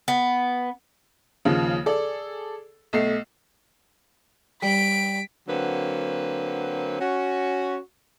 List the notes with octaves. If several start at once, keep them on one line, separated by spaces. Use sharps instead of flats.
B3
D#2 C#3 F3
G#4 A4 D5
B1 A3 C7
G3 B6 D7
D3 F#3 A#3 C4 B4
C#4 F#4